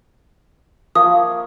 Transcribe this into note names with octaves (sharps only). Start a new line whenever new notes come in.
F3 A#3 C#5 D#6